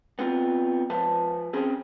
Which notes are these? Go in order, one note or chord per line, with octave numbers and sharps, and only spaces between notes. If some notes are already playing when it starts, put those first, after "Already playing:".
B3 C4 F4
F3 B4 A5
C4 C#4 G#4